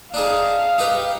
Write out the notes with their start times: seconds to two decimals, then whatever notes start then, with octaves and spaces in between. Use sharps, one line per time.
0.14 D4 D#4 G#4 F5
0.78 D#4 G4 B4